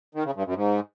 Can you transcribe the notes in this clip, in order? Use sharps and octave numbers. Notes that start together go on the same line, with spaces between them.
D#3
C#3
G2
F#2
G#2